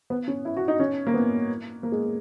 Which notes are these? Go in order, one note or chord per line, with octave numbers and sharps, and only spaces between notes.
B3
C#4
E4
F#4
D#4
C#4
A#3
B3
A#3
G#3